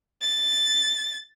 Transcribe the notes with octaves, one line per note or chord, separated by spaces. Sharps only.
A6